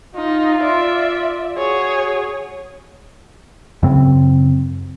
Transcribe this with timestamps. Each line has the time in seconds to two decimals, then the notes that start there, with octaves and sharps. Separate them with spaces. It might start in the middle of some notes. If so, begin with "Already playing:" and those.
0.15 D#4 F4
0.60 D5 E5
1.58 F#4 G#4 C#5
3.83 F#2 C#3 C4